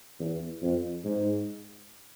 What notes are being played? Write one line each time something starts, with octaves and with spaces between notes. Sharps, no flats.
E2
F2
G#2